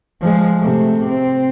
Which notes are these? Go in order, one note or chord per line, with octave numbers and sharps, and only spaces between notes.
F3 G#3
C3 A3
C4